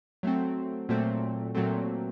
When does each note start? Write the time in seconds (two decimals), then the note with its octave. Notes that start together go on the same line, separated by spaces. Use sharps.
0.23 F#3 A3 C4
0.89 A#2 F#3 A3 C4
1.54 A#2 F#3 A3 C4